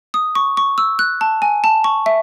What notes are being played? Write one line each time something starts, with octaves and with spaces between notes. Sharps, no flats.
D#6
C#6
C#6
E6
F#6
A5
G#5
A5
C#6
E5